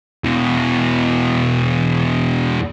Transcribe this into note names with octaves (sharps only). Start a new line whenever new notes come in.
E2 B2